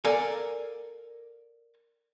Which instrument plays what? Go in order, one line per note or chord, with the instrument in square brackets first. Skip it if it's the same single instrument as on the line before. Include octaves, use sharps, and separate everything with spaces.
[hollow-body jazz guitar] A4 A#4 D5 F5 G#5